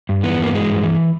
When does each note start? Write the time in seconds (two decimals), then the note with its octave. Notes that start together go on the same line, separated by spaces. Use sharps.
0.09 G2
0.23 E3 B3
0.39 G2 A#3
0.53 E3 G#3
0.68 G2
0.83 E3